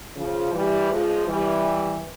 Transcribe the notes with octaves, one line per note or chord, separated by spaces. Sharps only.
C#3 F3
E3 G3
F3 G#3
E3 G3